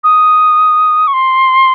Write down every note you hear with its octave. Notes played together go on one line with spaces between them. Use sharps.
D#6
C#6
C6